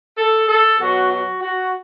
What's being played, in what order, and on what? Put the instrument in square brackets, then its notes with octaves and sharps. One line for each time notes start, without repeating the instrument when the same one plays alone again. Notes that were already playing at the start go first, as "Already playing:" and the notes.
[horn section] A4
A4
B2 F#3 F#4
F#4
F#4